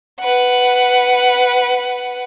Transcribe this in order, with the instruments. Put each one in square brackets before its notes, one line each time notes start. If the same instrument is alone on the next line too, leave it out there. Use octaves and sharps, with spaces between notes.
[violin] B4 F#5